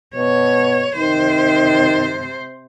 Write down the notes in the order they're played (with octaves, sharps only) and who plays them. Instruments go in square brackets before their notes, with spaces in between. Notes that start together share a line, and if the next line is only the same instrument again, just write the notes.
[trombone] B2 [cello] C#5
[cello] C3 C5 [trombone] D#3